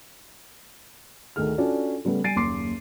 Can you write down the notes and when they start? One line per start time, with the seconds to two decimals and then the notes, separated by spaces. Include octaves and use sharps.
1.36 D2 D#3 A3 G#4 F6
1.58 C#4 D4 F4 F#4 A4 D5
2.05 C#3 G3 A3 B3
2.24 G3 G#5 A6 C7 D7 D#7
2.36 F#1 D#2 C6 D6 C7